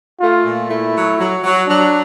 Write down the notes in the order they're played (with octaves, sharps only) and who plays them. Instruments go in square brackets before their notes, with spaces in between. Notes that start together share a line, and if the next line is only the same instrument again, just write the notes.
[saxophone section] A3 [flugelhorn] F4
[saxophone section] A#2
[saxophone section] A3 [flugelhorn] E4
[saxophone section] F#3
F#3
F#3
[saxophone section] F#3 [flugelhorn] D4